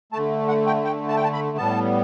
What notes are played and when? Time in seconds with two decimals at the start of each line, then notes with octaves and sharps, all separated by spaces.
0.12 A3 A5
0.17 D3
0.48 F#5
0.67 G5
0.84 G5
1.08 A5
1.17 G5
1.24 A5
1.33 B5
1.57 A2 G3 B3 A5